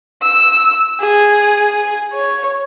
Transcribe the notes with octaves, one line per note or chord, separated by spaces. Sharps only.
E6
G#4
C#5